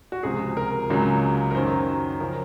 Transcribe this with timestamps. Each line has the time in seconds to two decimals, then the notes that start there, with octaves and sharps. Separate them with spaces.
0.12 F#4
0.23 C#2 C3 F3 G#4
0.57 A#4
0.90 C#2 C#3 F#3
1.51 A#4
1.55 F#2 D#3 F#3 C5
2.20 C#3 F3 A#4